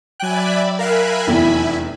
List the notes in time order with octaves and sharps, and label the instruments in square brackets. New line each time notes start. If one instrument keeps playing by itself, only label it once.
[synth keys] F#3 G5 [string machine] D5 E5 B5 [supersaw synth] G#5 F#6
[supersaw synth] A#4 F5 F#6 [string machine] E5 G#5 B5
[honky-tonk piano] F1 E2 [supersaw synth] E4